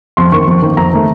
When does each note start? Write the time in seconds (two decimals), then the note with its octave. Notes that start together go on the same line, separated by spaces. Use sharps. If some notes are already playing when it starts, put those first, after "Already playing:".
0.17 F2 C6
0.32 D#3 A#3 C#6
0.48 F2
0.62 D#3 A#3
0.77 F2 A#5
0.93 D#3 A3